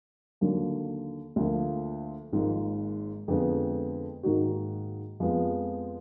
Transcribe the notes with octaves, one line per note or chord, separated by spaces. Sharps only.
D#2 D3 F#3 A#3
D2 D3 F3 A#3 F4
G#1 G#2 F3 A#3
F2 D3 G#3 B3
G#2 D#3 A#3 D#4 F#4
F2 F3 G#3 B3